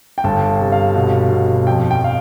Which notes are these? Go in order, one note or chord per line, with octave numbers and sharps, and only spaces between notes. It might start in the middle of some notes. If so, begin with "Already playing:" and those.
G5
G1 A5
C3
F5
B2
B2
F2 G5
G5
F5